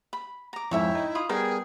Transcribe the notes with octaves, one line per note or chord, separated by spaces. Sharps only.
B5
A#5 D6
F2 G#2 E4 C#5 E5 G5
D#4
F4 B5 D#6
G3 B3 G#4 A#4 G5